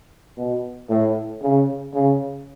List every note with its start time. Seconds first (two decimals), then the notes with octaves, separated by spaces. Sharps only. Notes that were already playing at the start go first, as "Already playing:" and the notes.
0.38 B2
0.89 A2
1.42 C#3
1.94 C#3